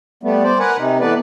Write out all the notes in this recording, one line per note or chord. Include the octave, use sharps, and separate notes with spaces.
G3 A3 B3
C5 D5
A#4 B4 F#5 G#5
C3 D#4
E3 A3 B3 B4 D5